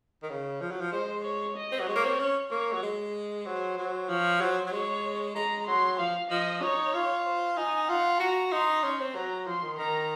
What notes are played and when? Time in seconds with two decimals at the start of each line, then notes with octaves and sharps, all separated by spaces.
0.23 D#3
0.30 C#3
0.61 F3
0.71 F#3
0.81 F3
0.92 G#3 C5
1.24 C#5
1.57 D#5
1.72 C4
1.80 F#3
1.87 G#3 C#5
1.95 A#3
2.04 C4
2.19 C#4
2.51 A#3 C#5
2.73 F#3
2.82 G#3
3.46 F#3 C5
3.78 F#3
4.09 F3 C#5
4.40 F#3 C5
4.66 F#3
4.72 G#3 C#5
5.36 G#3 A#5
5.67 F#3 C6
5.99 F3 F5
6.30 F3 D#5
6.62 D#4 C#5
6.94 F4
7.26 C5
7.57 D#4 G#5
7.88 F4 F#5
8.20 F#4 A#5
8.52 D#4 C6
8.83 C#4 C6
9.00 C4
9.15 F#3 A#5
9.47 F3 C6
9.63 D#3
9.79 D#3 A#5